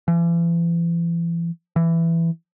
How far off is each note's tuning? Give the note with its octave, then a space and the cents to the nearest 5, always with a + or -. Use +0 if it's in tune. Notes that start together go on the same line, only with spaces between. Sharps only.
E3 +40
E3 +10